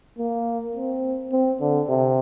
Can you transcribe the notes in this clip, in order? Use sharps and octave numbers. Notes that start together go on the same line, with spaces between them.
A#3
C4
C4
D3
C3